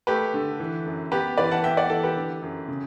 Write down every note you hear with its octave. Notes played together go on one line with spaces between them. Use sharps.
A3 G4 B4
D3
E3
F#2
B3 G4 B4
E3 B4 D5
F#5 A5
B3 E5 G5
D5 F#5
E3 A4
G4 B4
D3
F#2
C#3